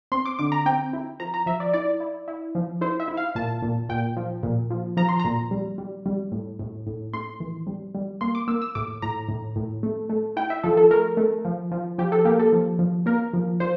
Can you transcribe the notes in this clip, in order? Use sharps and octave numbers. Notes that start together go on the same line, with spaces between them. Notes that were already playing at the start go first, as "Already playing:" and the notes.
C4 C6
D6
D3 D6
A#5
C4 G5
E4
F3 A#5
A#5
F3 E5
D5
E4 D5
E4
E4
F3
E4 C5
E5
E4
F5
A#2 A5
A#2
A#2 G5
F3
A#2
F3
F3 A#5
C6
A#2 A#5
G3
G3
G3
A2
A2
A2
A2 C6
E3
G3
G3
A#3 C6
D6
A#3 E6
E6
A2 D6
A2 A#5
A2
A2
A3
A3
E4 G5
E5
F3 A4
A4
A3 A#4
A3
F3
F3
F3 G4
A4
A#3 G4
A4
F3
F3
A#3 A#4
F3
F3 C5